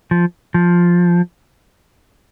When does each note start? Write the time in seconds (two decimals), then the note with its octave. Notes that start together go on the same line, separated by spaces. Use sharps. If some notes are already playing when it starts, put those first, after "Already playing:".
0.11 F3
0.54 F3